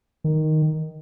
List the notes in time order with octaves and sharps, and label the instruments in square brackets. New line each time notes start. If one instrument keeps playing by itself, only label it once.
[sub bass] D#3